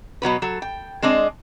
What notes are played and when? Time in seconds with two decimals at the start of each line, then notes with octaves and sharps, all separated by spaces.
0.22 B2 F#3 B3 B4
0.42 F#3 A4
0.62 G5
1.02 G#3 C4 D4 D#5